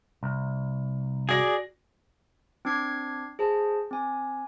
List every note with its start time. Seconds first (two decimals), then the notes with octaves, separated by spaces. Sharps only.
0.23 C2
1.29 F#4 G#4 D5 A#6
2.65 C4 D4 D6 G#6 C7
3.39 G#4 C5 A5
3.91 C4 G#5